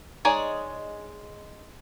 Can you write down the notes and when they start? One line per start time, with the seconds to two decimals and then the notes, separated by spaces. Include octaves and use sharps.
0.25 G#3 D#4 G#4 C#5 D5